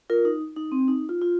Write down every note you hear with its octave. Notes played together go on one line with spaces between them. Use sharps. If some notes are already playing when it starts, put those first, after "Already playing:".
F4 A#4
D#4
D#4
C4
D#4
F4
F4